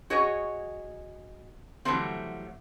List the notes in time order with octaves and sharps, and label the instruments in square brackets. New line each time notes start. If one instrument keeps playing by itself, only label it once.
[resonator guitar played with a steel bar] F#4 G#4 C#5 D#5
D3 E3 F#3 G3 A3 C4